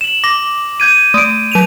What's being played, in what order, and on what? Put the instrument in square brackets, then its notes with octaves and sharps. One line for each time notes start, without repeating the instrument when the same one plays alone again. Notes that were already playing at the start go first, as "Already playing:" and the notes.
[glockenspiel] E7 F#7
[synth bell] D6 [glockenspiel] A#6
[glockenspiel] G6 G#6 D#7
[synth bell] A3 [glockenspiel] D#6 D7
[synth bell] F#3 D#7 F7